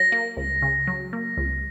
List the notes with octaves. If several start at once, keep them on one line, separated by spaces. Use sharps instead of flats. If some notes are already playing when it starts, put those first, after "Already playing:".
Already playing: F#3 A#6
A#3
C#2
C#3
F#3
A#3
C#2